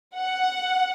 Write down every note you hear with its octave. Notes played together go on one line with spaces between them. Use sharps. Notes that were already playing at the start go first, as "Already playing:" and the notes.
F#5